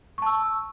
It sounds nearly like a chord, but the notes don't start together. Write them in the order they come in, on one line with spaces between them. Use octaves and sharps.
C#6 A5 E6